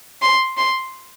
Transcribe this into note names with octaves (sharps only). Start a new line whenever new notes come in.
C6
C6